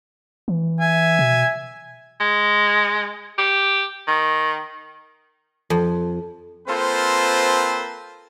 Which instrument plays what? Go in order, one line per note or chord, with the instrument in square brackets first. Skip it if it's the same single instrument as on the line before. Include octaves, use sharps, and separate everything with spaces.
[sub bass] E3
[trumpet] E5 [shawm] G#5
[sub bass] B2
[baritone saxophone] G#3
G4
D#3
[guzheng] F2
[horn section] A#3 C4 F4 A4 B4 C5